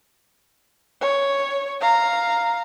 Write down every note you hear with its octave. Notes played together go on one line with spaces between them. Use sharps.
C#5
F5 A#5